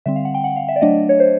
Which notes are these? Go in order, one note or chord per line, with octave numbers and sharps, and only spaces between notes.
D3 G3 C4 E5
F5
F#5
G5
F#5
F5
E5
D5
F#3 A3 D4 D#5
C#5
C5